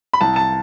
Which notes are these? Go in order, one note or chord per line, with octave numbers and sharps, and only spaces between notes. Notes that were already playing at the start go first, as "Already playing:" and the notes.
B5
C2 A5
A5